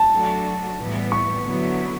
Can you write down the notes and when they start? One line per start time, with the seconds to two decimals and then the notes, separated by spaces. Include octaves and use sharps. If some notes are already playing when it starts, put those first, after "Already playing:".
Already playing: A5
0.10 F#3 A3 D4 F#4 A4
0.79 A2 E3 G3 B3
1.12 C#6
1.46 D3 F#3 B3 E4